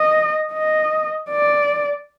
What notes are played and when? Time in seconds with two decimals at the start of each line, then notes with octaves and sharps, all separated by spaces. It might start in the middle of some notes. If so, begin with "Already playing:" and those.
Already playing: D#5
0.53 D#5
1.30 D5